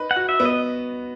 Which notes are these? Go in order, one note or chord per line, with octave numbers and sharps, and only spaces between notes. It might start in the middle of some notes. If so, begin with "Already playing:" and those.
Already playing: D#4 B4
F#5
F#4
E5
B3
D#5